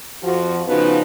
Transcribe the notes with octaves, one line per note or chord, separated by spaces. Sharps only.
F2 F3 F#4
C#3 F3 B3 D#4 F#4 B4